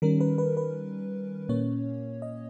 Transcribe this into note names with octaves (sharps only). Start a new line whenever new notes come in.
D#3 G3 C#4 A#4
B4
B4
B4
A#2 A#3 C#4 C#5
D#5